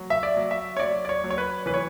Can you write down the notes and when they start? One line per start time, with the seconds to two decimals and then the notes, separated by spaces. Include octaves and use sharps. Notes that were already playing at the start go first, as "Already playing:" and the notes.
Already playing: F#3
0.10 E5
0.23 D5
0.37 F#3
0.51 E5
0.77 C#5
0.79 F#3 D5
1.05 D5
1.09 C#5
1.24 F#3
1.30 C#5
1.38 B4
1.66 E3 B4
1.74 C#5